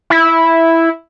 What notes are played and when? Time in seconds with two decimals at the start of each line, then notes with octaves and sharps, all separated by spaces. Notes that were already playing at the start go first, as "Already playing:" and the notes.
0.10 E4